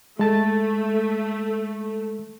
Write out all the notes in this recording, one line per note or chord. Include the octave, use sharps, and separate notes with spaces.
G#3 A3 A5 A6